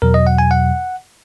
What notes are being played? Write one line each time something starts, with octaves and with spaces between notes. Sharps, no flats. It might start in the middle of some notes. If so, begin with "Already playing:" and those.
E2 B2 F#3 A#4
D#5
F#5
G#5
F#5